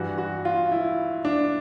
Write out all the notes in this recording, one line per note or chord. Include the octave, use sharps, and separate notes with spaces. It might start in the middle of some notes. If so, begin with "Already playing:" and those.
Already playing: G2 E3 F#4
F#4
F4
E4
D4